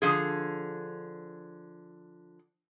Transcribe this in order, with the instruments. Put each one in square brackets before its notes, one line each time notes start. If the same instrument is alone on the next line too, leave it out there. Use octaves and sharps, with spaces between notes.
[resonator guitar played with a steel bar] D3 F3 G#4